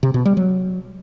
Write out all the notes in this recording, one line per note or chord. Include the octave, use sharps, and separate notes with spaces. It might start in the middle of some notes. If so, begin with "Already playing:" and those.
C3
B2
G3
F#3